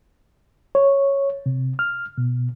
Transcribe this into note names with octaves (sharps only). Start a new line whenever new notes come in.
C#5
C3
F6
B2